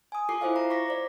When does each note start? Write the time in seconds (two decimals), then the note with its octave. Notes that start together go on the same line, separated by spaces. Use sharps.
0.12 G#5 D#6
0.29 F4 A4 D6 C7
0.41 E4 F4 C5 D#5 F5
0.56 A#5
0.70 C#6 D6 A#6 B6
0.88 C5 D5